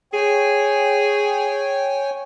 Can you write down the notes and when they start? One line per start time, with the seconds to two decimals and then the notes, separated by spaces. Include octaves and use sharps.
0.14 G#4 C#5 G5 G#5